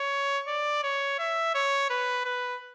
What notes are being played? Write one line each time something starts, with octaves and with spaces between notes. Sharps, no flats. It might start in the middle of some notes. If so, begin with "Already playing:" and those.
Already playing: C#5
D5
C#5
E5
C#5
B4
B4